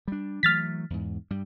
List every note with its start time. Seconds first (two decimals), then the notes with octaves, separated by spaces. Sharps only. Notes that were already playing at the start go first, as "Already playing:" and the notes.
0.08 G3 D4
0.43 E3 F#3 A3 F6 A6 B6
0.90 E2 G#2
1.30 G2 G3